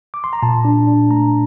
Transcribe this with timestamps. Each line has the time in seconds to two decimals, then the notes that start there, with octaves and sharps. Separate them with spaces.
0.14 D6
0.24 C6
0.33 A#5
0.42 A#2 A5
0.65 D4
0.87 D4
1.10 A3 A#5